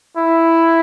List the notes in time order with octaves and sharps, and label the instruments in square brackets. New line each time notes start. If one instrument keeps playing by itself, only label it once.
[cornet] E4